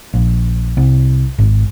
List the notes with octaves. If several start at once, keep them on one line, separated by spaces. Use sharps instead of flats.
A#1
C2
G#1